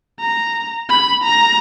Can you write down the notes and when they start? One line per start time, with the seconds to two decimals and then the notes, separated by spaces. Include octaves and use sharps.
0.20 A#5
0.89 B5
1.23 A#5